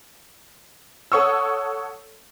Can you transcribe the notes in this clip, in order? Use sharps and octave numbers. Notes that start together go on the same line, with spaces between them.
A4 C#5 F#5 C#6 D#6 E6